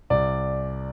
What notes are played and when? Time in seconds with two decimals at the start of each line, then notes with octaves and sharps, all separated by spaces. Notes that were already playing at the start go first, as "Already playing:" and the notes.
0.10 C2 D5